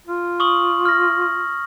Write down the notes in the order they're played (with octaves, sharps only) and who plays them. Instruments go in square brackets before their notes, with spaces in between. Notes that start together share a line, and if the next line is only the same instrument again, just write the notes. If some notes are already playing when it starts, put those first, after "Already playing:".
[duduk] F4
[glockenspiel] C#6 D#6 F#7
F6 A#6